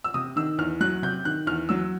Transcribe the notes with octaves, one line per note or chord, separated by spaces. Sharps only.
E6
C3 D#6
D#3 E6
E2 F6
F#3 F#6
C3 G6
D#3 F#6
E2 F6
F#3 E6